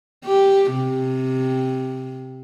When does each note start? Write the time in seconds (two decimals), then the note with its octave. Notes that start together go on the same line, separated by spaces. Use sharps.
0.25 G4
0.74 C3